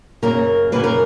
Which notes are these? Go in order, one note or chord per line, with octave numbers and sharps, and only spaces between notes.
F#2 C#3 F#3 A#3 A#4
F#2 C#3 F#3 A#3 B4
A#4